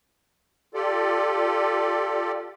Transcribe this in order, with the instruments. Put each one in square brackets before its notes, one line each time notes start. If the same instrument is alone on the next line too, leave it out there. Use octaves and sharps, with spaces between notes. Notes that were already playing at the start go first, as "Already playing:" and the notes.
[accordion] F4 G4 A4 D5